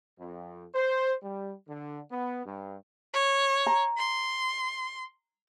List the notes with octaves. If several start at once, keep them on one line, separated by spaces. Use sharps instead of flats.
F2
C5
G3
D3
B3
G2
C#5
A#5
C6